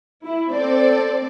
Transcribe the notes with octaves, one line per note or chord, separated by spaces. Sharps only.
E4
C4 A4 D5